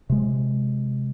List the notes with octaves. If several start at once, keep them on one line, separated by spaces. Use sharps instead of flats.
C3 G#3